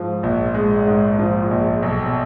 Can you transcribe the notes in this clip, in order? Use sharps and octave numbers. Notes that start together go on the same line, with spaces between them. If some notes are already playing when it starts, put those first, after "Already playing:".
Already playing: G#2 F3
A#1
G#3
G#2
F3
A#1
B1